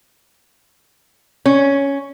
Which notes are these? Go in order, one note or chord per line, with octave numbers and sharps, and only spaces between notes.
C#4